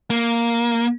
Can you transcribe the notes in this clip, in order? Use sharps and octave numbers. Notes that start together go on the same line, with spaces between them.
A#3